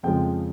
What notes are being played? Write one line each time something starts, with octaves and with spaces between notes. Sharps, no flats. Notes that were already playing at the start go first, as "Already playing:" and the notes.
F2 C#3 F3 G#3 G5